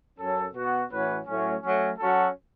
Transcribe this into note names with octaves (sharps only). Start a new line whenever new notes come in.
F#2 F#3 C#4 A4
B2 B3 F#4
A2 E3 C#4 F#4 B4
A2 F#3 A3 C#4
F#3 A3 C#4
F#3 C#4 F#4 A4